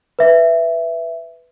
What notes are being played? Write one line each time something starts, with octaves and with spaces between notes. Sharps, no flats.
B4 E5